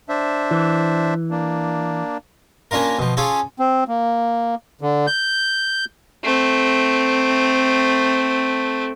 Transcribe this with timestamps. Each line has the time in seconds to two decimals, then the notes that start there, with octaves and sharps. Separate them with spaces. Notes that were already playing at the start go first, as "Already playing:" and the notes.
0.09 D4 C5 E5
0.51 E3
1.31 A#3 D4
2.71 A#3 C#4 D4 F4 A#4
2.99 B2 F3
3.17 C#4 F4 G#4 A4
3.59 C4
3.88 A#3
4.81 D3
5.07 G6
6.24 A3 C4